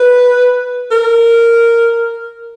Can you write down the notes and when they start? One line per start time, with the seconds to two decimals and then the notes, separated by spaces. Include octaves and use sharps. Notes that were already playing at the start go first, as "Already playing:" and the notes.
Already playing: B4
0.91 A#4